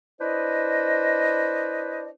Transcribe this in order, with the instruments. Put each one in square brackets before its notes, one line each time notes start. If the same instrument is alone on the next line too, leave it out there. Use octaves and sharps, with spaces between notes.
[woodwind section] D4 E4 B4 C5 D#5